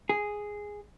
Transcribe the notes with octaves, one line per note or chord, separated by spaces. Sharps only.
G#4